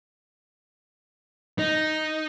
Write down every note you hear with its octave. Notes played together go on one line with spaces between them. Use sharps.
D#4